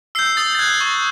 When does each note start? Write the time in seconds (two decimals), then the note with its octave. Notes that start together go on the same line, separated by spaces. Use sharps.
0.15 E6 G6 C7
0.37 D#6 A6
0.55 A6
0.59 F#6 G#6
0.81 C#6